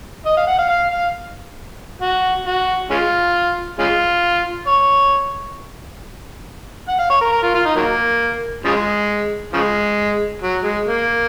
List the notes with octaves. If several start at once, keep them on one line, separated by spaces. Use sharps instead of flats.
D#5
F5
F#5
F5
F5
F5
F#4
F#4
G#3 C#4 F4
G#3 C#4 F4
C#5
F#5
F5
C#5
A#4
A#4
F4
F4
D#4
D#3 F#3 A#3
C#3 F3 G#3
C#3 F3 G#3
F#3
G#3
A#3